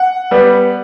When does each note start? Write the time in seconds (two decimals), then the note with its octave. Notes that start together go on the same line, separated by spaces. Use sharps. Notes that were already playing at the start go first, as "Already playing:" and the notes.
Already playing: F#5
0.31 G3 B3